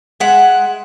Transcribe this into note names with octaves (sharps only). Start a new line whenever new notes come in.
G#3 E5 F#5